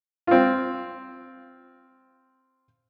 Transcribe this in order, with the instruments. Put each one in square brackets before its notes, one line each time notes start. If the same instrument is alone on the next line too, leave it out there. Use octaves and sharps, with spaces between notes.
[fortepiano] C4 F4